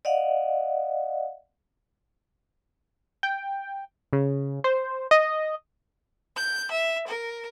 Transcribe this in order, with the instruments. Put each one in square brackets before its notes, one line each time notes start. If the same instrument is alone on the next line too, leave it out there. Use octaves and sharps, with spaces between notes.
[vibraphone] D5 D#5 F5 F#5
[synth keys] G5
C#3
C5
D#5
[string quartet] G6
E5
A#4